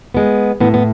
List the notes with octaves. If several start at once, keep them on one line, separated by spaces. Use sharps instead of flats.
G#3 B3
A2 B3
B3